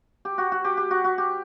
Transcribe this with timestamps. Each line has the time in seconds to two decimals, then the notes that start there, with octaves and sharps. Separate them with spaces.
0.25 G4
0.38 F#4
0.52 F#4
0.64 G4
0.77 G4
0.91 F#4
1.04 F#4
1.18 G4